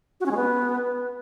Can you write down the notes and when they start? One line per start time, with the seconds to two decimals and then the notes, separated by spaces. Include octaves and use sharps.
0.20 F#4
0.26 C#4
0.31 G#3
0.37 B3